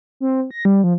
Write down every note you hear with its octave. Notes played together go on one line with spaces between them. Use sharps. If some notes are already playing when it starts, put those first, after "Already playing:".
C4
A#6
G3
F3